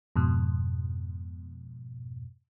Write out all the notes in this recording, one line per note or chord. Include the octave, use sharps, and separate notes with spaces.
F2 G#2 B2